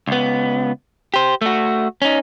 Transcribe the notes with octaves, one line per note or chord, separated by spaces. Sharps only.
C#2 B3
G4 C5
A3 F#4
C#4 D#4